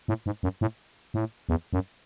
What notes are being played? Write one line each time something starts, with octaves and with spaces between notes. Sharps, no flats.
A2
G#2
F#2
A2
A2
E2
F#2